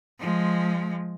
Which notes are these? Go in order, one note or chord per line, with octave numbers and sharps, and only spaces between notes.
F3 G#3